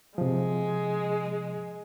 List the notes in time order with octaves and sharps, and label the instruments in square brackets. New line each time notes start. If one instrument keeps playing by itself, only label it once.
[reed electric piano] C3 F3 [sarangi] G#3